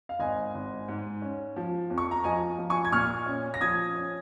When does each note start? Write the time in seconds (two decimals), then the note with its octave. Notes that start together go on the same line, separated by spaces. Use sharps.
0.09 F5
0.19 G#1 D#5 G#5
0.55 G#1
0.88 G#2
1.22 C#4
1.56 F3
1.90 F2
1.98 C#6
2.11 A#5
2.24 F3 D#5 G#5
2.58 F3
2.70 G#5 C#6
2.85 G#6
2.92 A#2 C#6 F6
3.26 C#4
3.54 A#6
3.60 F3 D#6 G#6
3.95 C#4